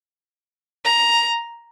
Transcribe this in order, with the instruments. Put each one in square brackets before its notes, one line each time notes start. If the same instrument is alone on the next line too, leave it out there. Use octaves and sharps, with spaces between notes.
[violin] A#5